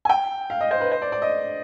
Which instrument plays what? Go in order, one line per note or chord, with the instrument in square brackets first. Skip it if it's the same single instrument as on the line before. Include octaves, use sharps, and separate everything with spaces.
[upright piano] G#5
G5
F5
D#5
C5
B4
C5
D5
D5
D#5